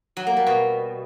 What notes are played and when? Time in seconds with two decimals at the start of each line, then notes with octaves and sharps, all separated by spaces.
0.17 F#3
0.27 A#3
0.37 G3
0.47 B2